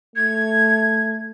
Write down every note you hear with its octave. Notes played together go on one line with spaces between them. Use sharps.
A3 G#6